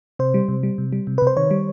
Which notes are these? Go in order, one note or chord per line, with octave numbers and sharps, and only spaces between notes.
C3 C5
G3
C3
G3
C3
G3
C3
C3 B4
C5
D#3 C#5
G3